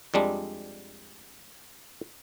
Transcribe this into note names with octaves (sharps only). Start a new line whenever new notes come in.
F2 G3 G#3 D4